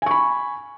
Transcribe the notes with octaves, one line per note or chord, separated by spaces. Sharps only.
G#5 B5 C#6